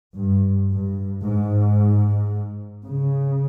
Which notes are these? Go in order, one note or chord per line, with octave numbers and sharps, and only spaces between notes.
G2
G2
G#2
C#3